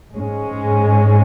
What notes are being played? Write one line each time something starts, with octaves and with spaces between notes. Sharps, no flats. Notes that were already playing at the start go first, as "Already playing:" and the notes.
G#2 G#3 C#4